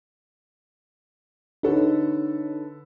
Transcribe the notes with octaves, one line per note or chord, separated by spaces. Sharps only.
D3 D#4 A4 B4 C#5